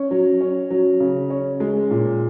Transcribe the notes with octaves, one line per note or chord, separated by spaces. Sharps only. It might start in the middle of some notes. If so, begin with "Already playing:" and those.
Already playing: C#4
F#3
C#4
F#3
C#3
C#4
G#3
A#2